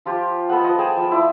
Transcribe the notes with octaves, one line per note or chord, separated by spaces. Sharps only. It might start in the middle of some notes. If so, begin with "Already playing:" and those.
F3 F4 G4
B3 A4 D#5 F#5
F3 D#5
G#4 G5 A5
F3
E4 D5